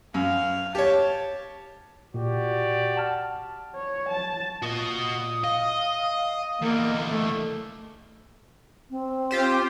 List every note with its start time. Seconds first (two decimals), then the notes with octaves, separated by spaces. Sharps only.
0.14 F#2 F5
0.75 G4 C#5 A5
2.14 A#2 F#4 G4 D5
2.96 F#5 A5 F6
3.76 C#5
4.09 A5
4.62 A#2 F#4 D#5 D#6
5.44 D#5 F5
6.62 E2 D3 A#3 D#5
7.09 A3 E5
8.91 C4
9.31 F4 G4 C5